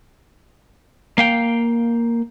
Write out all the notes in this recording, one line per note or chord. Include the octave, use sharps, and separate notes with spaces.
A#3 F5 G5